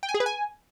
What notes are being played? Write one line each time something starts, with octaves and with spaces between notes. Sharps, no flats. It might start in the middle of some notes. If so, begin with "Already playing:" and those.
G5
G#5
G#4
B4
G#5